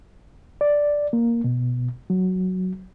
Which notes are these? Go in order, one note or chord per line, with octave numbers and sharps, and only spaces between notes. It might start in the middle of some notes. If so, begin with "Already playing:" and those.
D5
A#3
B2
F#3